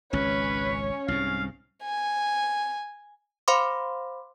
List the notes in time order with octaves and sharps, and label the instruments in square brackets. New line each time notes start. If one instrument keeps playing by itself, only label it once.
[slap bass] G#1 C#2 [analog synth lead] C#4 [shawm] B4 [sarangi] C#5
[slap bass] C2 G#2 [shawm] F5
[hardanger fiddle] G#5
[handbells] C5 F5 B5 C6 D6